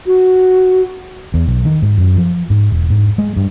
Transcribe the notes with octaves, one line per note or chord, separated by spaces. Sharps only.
F#4
E2
B1
D#3
G#2
F#2
F3
G#2
E1
G#2
G#3
G2